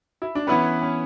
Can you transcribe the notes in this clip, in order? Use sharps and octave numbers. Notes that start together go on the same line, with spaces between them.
E4
D4
E3 B3 C#4 E4 B4
C#4